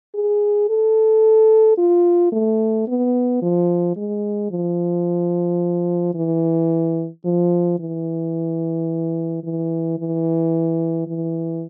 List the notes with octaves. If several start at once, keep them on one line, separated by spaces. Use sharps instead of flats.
G#4
A4
F4
A3
B3
F3
G#3
F3
E3
F3
E3
E3
E3
E3